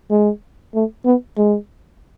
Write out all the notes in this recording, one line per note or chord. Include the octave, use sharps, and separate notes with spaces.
G#3
A3
B3
G#3